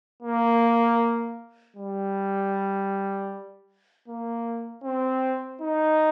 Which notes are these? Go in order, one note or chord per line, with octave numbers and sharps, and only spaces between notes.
A#3
G3
A#3
C4
D#4